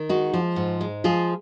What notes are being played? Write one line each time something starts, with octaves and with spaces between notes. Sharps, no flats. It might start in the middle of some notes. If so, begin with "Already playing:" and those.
Already playing: D#3
G#3 D#4 F#4
F3
G#2
G#3
F3 F4 G#4